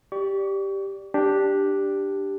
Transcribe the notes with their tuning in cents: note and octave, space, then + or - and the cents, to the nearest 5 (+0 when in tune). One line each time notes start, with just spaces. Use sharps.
G4 +0 D5 +0 C#6 +30
D4 +0 G4 +0